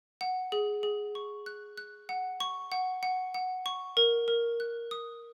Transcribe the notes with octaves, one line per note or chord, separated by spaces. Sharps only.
F#5
G#4
G#4
C#6
F#6
F#6
F#5
C#6
F#5
F#5
F#5
C#6
A#4
A#4
F#6
D#6